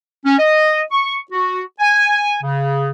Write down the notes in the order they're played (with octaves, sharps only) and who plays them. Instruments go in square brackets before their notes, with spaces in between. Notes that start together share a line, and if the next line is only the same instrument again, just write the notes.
[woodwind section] C#4
D#5
C#6
F#4
G#5
C#3